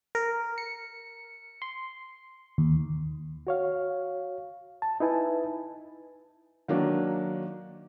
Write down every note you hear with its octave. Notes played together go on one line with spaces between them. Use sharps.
A#4
C#7
C6
D#2
F#4 C#5 F5
A5
D#4 E4 B4 G#5 A5
D#3 F#3 A#3 D4